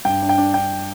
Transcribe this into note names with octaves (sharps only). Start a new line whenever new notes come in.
G2 G5
D4
G5
D4
D4 G5